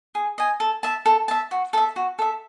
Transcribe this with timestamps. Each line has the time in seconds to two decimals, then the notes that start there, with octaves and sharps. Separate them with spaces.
0.15 G#4
0.38 D#5 G#5
0.60 A4
0.83 E5 A5
1.06 A4
1.28 E5 A5
1.51 F#4
1.73 A4 E5
1.96 F#4
2.19 A4 E5